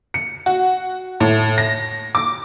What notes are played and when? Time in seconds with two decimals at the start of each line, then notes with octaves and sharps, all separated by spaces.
0.14 C#7
0.46 F#4
1.20 A2
1.58 A#6
2.15 D6